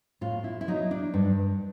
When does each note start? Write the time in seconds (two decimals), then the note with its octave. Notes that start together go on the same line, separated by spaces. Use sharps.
0.21 A2 F4
0.44 E4
0.61 E4
0.68 F#3 D#4
0.91 D4
1.14 G2